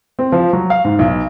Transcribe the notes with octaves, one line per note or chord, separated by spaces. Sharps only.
C4
F3
F#3
F5
G#2
B1